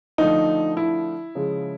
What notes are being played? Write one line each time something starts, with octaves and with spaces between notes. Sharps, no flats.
D3 F3 A3 D#4
E4
C#3 F3 G#3